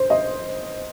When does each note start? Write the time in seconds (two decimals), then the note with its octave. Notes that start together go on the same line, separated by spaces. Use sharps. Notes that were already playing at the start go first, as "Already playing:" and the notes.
Already playing: C5
0.10 D#5